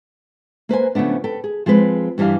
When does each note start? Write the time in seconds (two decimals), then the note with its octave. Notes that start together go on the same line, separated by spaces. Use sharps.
0.69 A#3 B4 C5 G#5
0.95 C#3 F3 A3 B3 D4
1.24 A4 B4 G5
1.44 G#4
1.66 F3 G#3 C4 B4
2.18 G2 E3 G3 D4 F5